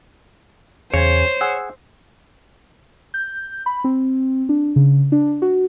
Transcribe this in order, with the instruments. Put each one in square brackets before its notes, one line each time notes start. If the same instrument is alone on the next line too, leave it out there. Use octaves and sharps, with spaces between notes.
[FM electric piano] E2 [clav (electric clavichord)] C#3 G#5 [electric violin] C5 [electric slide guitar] C#5
[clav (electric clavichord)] G#4 F#5 [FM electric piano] E6
[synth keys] G6
B5
C4
D4
C#3
D4
F#4